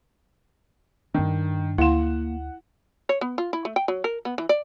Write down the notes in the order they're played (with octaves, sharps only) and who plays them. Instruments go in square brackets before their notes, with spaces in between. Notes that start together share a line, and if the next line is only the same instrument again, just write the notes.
[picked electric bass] G2 D4 [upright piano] D#3
[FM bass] D2 [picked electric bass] A#3 [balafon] E4 F5 C6 [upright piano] F#5 E7
[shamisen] C#5
B3
F4
E4
A3
G5
F#3
A#4
B3
E3
D5